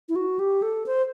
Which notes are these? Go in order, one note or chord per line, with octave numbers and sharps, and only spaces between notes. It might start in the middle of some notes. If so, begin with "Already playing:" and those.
E4
F#4
G4
A4
C5